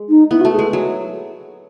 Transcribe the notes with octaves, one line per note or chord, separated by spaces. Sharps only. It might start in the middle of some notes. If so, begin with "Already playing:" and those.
Already playing: G#3
D#4
B3 E4
F#4
A3
G#4
G#3 A4
F#3